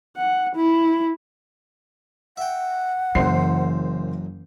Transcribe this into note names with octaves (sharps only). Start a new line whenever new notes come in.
F#5
E4
E5 F#5 G5
F#1 F#2 E3 C5 C7